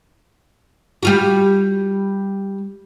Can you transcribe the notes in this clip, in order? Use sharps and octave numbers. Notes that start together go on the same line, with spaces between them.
G3 F4 F#4